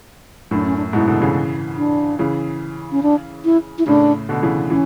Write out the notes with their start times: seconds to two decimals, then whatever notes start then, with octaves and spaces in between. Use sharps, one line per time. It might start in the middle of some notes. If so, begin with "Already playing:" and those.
0.51 F#2 A2 D4
0.65 C#4
0.77 D4
0.93 G#2 B2 E4
1.07 B2 D3
1.21 C#3 E3
1.77 D4
2.19 C#3 E3
2.92 C#4
3.03 D4
3.45 E4
3.79 E4
3.87 A2 C#3 D4
4.29 B2 D3
4.42 C#3 E3
4.70 E3 C#4